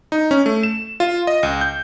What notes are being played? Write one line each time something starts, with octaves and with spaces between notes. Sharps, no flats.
D#4
C#4
A3
E7
F4
D#5
C#2
G6